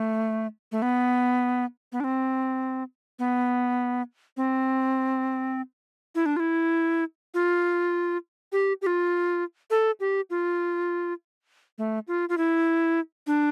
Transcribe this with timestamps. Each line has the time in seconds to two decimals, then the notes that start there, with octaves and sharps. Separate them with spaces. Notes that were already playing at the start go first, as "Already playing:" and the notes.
Already playing: A3
0.72 A3
0.82 B3
1.92 B3
2.00 D4
2.04 C4
3.19 B3
4.37 C4
6.15 E4
6.26 D4
6.36 F4
6.40 E4
7.34 F4
8.52 G4
8.82 G4
8.86 F4
9.70 A4
10.00 G4
10.30 F4
11.78 A3
12.08 F4
12.29 F4
12.38 E4
13.27 D4